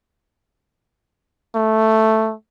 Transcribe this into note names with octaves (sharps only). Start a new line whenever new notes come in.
A3